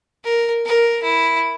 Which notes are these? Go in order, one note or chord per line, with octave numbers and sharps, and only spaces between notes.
A#4
A#4
E4